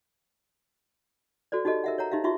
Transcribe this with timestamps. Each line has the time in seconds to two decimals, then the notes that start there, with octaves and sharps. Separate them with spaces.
1.52 F#4 A4 C5 D5
1.65 D#4 F#4 G4 A4 D#5
1.84 A#4 E5 F#5
1.98 C#5 F#5 A#5
2.11 D#4 G4 E5 F5
2.24 D#4 F4 F#4 E5 C#6